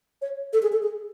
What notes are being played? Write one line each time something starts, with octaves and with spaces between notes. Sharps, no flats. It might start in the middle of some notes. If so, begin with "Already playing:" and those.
C#5
A4
G#4
A4
G#4